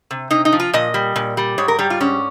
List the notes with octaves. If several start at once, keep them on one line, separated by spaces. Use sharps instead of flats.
C3
C3 D#4
D#4
F3
F4
A#2 D#5
G3
A#2
G3
G#2 C#5
A#4
G3 G4
F4
G#2 C#4